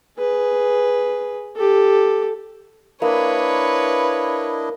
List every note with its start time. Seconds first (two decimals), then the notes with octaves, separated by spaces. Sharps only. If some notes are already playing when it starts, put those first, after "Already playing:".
0.18 G#4 B4
1.55 G4 A4
3.02 A#3 D4 E4 B4 C#5 D#5